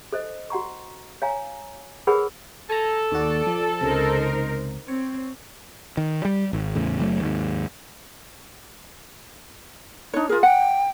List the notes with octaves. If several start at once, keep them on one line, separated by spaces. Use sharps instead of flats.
A4 C5 D#5
F#4 F#5 A#5 C#6
C#5 F5 G#5 A#5
G#4 A#4 B4 C#5 F#5 B5
A4 G#5 A#5
D#2 F#4 D5
F3
C#2 C3 D#4 A#4 C5
C4 C#5
D#3
G3
G#1
E2 A2 C#3
F#1 F#3 A3
D#2 G#2
D4 D#4 C#5
F4 G#4 A#4
F#5 G5